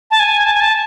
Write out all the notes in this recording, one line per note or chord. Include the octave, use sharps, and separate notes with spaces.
A5
G#5
A5
G#5
A5